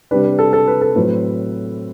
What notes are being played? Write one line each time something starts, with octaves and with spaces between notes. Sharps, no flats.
C3 G3 D4 B4
B4
A4
A4
B4
A4
A2 F#3 C4 B4